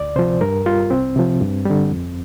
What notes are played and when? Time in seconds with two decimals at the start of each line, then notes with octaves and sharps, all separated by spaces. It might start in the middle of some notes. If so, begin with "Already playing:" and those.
Already playing: D2 D5
0.16 C3 F3 C5
0.41 G2 A#4
0.66 G3 F4
0.90 C2 C4
1.16 C3 F3
1.41 G2
1.66 D3 G3
1.91 F2